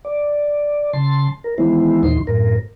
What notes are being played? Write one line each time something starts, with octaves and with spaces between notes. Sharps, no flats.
D5
C#3 A5 C6
A#4
D#3 E3 G#3 B3 E4 C5
D#2 A#2 E3 D#4 C6
F#2 A2 A#4